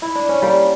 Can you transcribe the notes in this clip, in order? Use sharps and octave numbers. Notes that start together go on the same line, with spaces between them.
E4
D4
C#4
G3 A#3